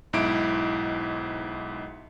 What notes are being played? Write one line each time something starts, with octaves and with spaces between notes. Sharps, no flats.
B1 G#2 E4 D7